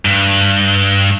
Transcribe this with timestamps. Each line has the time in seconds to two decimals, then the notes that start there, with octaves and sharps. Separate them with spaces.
0.05 G2